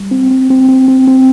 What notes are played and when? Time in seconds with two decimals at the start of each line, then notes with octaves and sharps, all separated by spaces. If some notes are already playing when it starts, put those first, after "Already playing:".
Already playing: G3
0.11 C4
0.31 C4
0.50 C4
0.69 C4
0.88 C4
1.08 C4